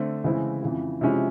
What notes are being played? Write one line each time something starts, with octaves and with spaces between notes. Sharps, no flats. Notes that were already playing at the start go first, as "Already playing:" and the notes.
Already playing: D3 A3 C4
C#3 E3 G#3 C4 E4
F2 C#3 E3
C3 F3 G#3 C#4 E4